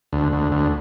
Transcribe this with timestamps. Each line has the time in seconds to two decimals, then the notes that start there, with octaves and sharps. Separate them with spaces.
0.13 D2
0.32 D2
0.52 D2